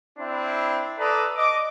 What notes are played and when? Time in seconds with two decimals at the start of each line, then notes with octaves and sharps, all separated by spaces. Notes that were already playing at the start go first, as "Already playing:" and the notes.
0.19 C4 D4 E4
0.98 A4 B4 D5 A#5 D#6
1.35 D#5 D6